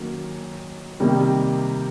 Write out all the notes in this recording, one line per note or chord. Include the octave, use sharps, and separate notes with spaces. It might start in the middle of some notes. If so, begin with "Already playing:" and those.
Already playing: D#3 F#3 A#3 C#4
C3 D#3 G3 A#3